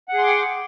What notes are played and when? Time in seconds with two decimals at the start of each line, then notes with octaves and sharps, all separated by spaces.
0.08 F#5
0.13 G#4
0.18 C6
0.23 D6
0.28 G5